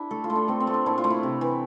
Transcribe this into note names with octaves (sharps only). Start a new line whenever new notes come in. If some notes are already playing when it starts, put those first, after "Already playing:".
Already playing: D4 E4 G4
A3 A4
F4
A3
D4
A3 C4
C4
A3
D4
A#2 E4
F4
A3
E4
C3
E3